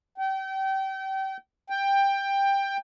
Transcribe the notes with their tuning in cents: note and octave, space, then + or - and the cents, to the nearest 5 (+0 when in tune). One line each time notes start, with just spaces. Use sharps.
G5 -30
G5 +15